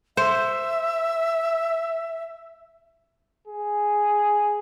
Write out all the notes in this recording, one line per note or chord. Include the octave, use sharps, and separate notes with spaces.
C5 E5
G#4